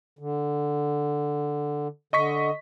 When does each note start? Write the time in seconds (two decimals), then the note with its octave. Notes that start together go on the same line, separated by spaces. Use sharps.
0.19 D3
2.13 D3 D#5 C#6 B6